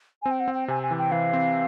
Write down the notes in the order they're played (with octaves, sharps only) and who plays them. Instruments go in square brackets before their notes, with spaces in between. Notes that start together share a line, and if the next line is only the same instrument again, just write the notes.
[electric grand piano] C4 [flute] G#5
[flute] G5
F#5
[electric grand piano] C4
[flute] G5
[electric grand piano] C3 [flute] G#5
[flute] G#5
[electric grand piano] E3
[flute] G5
[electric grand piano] E3 [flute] F5
[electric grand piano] C4